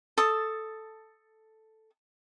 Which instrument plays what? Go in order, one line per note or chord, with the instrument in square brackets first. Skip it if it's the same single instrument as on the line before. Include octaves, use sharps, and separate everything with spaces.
[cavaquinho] A4 A5 D#6